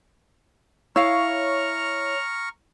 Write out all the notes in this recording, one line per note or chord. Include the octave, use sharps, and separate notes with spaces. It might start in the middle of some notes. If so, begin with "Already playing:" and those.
E4 C#5 F5 A#5 C#6 F6